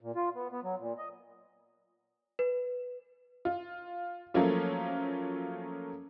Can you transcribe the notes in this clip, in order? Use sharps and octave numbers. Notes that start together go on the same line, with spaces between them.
A#2
F4
B3
B3
F#3
A#2
D#5
B4
F4
F3 F#3 A3 A#3 C#4 F4